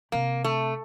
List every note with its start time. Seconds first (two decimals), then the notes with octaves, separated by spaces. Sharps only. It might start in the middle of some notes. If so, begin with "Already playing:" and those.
0.12 C3 A#3
0.44 A3